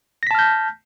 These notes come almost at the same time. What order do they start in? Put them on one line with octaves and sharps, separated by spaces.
A#6 B6 A5 F6 G6